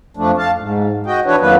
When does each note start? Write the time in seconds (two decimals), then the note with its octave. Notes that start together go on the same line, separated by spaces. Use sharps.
0.17 F2 F3 A3 D4
0.38 F5 A5
0.58 G#2
1.06 F#4 D#5 G5
1.25 E3 D4 E4 F#4 B4 C#5
1.40 F2 D#3 F#3 A#3 B3 B4